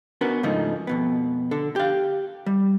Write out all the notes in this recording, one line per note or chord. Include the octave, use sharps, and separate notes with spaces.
B3 C#4 D4 F#4 A#4 B4
G#2 C#3 F3 A3 D#4
F2 B2 B3
D3 A4
G4 F5
G3